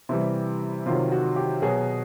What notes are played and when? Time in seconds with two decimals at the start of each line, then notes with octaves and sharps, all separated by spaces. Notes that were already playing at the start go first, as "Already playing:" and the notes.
0.09 C3 E3 G3 E4
0.86 C3 D#3 F#3 F4
1.12 F#4
1.36 G4
1.62 B2 F#3 G#4